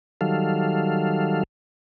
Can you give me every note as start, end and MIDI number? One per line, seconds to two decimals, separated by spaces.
0.21 1.43 51
0.21 1.43 54
0.21 1.43 55
0.21 1.43 69
0.21 1.43 77